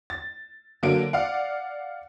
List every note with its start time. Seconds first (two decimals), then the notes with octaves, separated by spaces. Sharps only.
0.10 A6
0.83 D3 F#3 A#3 D7
1.13 D5 F5 F#5